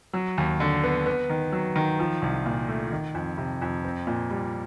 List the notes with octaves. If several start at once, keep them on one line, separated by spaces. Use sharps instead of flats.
F#3
D#2
D3
B3
B3
D#3
F#3
D#3
F3
C2
A#2
A3
D#3
F2
C3
F2
C4
A#2
G3